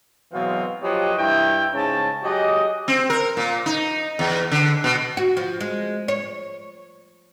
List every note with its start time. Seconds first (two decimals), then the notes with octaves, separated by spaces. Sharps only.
0.33 B2 E3 F#3 G#3 C4 F5
0.83 F3 F#3 G4 B4 C#5 D#5
1.17 G2 E4 G5
1.73 G#2 C#3 C#4 A5
2.23 F#3 G4 G#4 D#5
2.88 C4
3.10 A#4
3.37 A#2
3.66 D#4
4.19 E2
4.51 D3
4.84 B2
5.17 F#4
5.37 F3
5.60 G#3
6.08 C#5